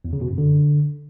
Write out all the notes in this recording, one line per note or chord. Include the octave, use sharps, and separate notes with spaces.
E2
C#3
B2
F#2
D3